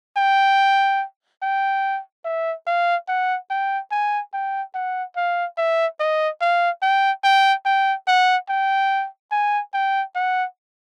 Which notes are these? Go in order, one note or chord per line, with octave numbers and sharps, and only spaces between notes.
G5
G5
E5
F5
F#5
G5
G#5
G5
F#5
F5
E5
D#5
F5
G5
G5
G5
F#5
G5
G#5
G5
F#5